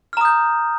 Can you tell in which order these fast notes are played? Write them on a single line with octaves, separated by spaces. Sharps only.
F6 A#5 D#6 G6